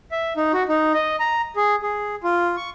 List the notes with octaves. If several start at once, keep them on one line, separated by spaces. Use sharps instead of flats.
E5
D#4
F#4
D#4
D#5
A#5
G#4
G#4
F4
C#6